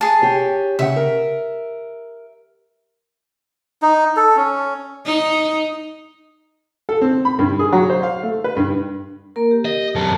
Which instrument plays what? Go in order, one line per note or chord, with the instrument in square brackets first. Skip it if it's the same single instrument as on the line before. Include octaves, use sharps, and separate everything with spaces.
[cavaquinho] G#4 A5
[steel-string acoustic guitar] G4 C#5
[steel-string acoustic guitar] C#3 F#5 [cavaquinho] E5
[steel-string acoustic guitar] A#4
[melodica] D#4
A4
C#4
[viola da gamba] D#4
[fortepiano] A4
C4
B5
G2
G#4
F#3
C5
F5
A3
B4
G2
[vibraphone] A#3 A#4
G4
[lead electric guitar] D#5
F#2 A4